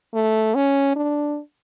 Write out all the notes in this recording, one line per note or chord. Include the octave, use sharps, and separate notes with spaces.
A3
C#4
D4